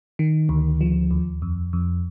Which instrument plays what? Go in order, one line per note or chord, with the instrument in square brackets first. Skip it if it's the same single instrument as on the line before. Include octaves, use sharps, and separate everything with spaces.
[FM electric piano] D#3
D2
F3
D#2
F2
F2